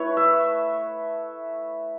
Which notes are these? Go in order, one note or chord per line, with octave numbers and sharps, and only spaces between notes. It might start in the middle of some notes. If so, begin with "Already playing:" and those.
Already playing: A3 E4 B4 C#5
E5